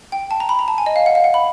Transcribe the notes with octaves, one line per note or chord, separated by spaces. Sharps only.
G5
A5
A#5
B5
A#5
A5
G#5
D#5
F5
F#5
F5
F#5
B5